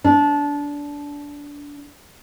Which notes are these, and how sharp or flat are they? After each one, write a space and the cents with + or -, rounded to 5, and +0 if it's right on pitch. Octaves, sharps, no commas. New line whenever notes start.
D4 -20